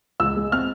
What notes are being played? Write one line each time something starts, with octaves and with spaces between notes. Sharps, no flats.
C#2 E6
G#3
C4 F6